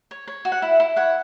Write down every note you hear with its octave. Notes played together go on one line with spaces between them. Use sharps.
C#5
C#5
F#4
F#5
E4 E5
E4
C#5 F#5